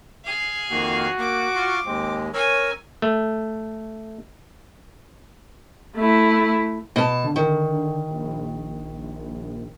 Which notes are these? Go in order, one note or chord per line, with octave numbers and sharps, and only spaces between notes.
G#4 F5
F2 D#3 A#3 F#4
A#3 D6
F4 C6 C#6
D#2 G#3 C4
C#4 A#4 C#5 G#5 E6
A3
A3 E4
B2 A5
D3
D#3
A#1